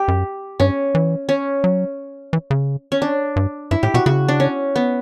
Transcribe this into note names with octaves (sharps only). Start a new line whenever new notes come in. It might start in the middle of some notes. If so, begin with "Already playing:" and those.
Already playing: G4
F#2
G2 C#4
E3
C#4
F#3
E3
C#3
C#4
D4
G2
G2 E4
A2 G4
B2 F#4
C#3 F#4
D4
C#4
B3